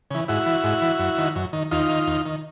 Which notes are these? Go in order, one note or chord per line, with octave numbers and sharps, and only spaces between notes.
C#3 E3
G#2 E4 F#4
E3
G#2
E3
F#2
D#3
F#2
D#3
D#2 D#4 F4
D#3
D#2
D#3